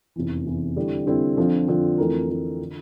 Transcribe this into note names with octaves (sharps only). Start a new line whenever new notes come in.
F1 E2 E3
F1 E2 E3
D3 G3 C4 E4
D3 G3 C4 E4
F2 D3 F3 C4 F4
F2 D3 F3 C4 F4
F2 E3 A3 E4 A#4
F2 E3 A3 E4 A#4
D3